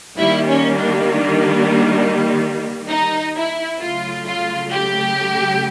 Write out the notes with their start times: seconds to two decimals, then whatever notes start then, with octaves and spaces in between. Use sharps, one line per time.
0.18 D#3 G3 A#3 E4
0.47 C#4
0.78 D4
1.08 D4
2.89 D#4
3.35 E4
3.80 C#3 F#3 A3 F4
4.25 F4
4.71 G4